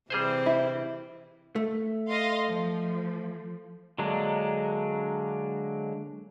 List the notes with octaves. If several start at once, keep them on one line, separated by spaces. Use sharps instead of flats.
C3 E3 G3 C4 G#4 C5
E4
A3
D#5 F5 C6
F3
D3 F#3 G#3 A#3 D4